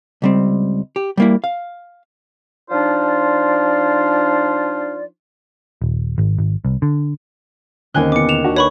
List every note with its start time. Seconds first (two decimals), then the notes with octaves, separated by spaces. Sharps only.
0.22 C#2 G3 C4
0.96 G4
1.17 G3 A#3 E4
1.44 F5
2.70 F3 D4 D#4 F4 C5 D5
5.82 D#1
6.18 G#1
6.39 G#1
6.65 C2
6.82 D3
7.94 D#2 D3 D#3 C4 C#4 G#5 F#6 G7
8.12 E2 B2 D6 C#7
8.29 E7 F7
8.45 D4 F#4
8.56 B4 C#5 B5 C#6